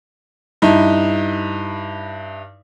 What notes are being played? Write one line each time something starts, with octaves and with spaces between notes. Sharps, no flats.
G2 D#4 E4